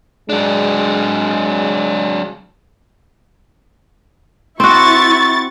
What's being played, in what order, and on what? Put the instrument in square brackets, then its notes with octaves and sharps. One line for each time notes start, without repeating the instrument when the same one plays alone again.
[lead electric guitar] F#3 D4 [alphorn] G#3
[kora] C4 F#4 [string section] E4 C#6 A6